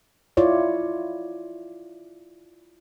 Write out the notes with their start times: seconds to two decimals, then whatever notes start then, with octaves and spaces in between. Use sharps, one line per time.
0.37 E4 F4 C#5 D5